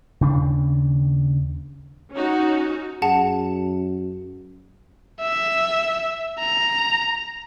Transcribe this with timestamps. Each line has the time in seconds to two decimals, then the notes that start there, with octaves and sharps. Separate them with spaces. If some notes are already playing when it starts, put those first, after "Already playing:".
0.21 D#2 C#3 D4
2.13 C#4 D#4 F#4
3.02 F#2 G#4 F#5 A5
5.21 E5
6.39 A#5